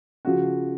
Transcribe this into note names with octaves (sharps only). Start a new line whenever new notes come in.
C#3 F3 F#4